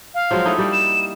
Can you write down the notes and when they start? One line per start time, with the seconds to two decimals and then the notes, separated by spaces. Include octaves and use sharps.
0.14 F5
0.31 F3 F#3 G#3
0.45 A3 D#4 E4
0.58 G3 A#3
0.73 E7